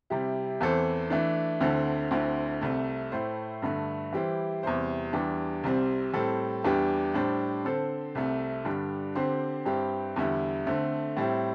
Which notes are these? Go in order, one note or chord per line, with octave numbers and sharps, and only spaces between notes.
C3 G3 E4 G4
E2 E3 C4 A4 C5
E3 A3 D4
D2 D3 C4 E4 A4
D2 D3 C4 E4
C2 C3 A3
A2 A3 E4 C5
G2 D3 A3
E3 G3 E4 G4 C5
E2 C3 G3 E4 C5
E2 E3 G3 D4 G4
C2 C3 G3 C4
A2 G3 C4 A4
E2 E3 G3 D4 G4
A2 G3 D4 C5
D3 C4 A4 C5
C2 C3 A3
G2 D3 G3 D4
D3 C4 G4 C5
G2 G3 C4 E4 G4
E2 D3 G3 E4
D3 A3 C4
A2 G3 C4 E4